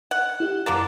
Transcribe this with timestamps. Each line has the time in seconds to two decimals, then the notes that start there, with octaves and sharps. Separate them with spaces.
0.11 F#5
0.40 E4 G4
0.66 F#2 D3 F3 A#3 F#6 A6